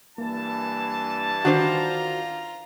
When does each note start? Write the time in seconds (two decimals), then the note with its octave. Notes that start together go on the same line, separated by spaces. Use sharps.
0.18 G2 E3 A#3 A5
1.45 D#3 D4 F4 F#4 C5 A#5